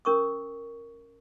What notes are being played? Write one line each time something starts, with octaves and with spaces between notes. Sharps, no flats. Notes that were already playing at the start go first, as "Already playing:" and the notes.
C#4 A#4 C#6 D#6